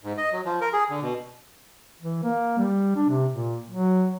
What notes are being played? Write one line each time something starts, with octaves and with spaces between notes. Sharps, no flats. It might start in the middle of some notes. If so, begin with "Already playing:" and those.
G#2
D#5
F#3
F3
A#4
G#4
D3
B2
E3
A#3
G3
D4
C3
A#2
F#3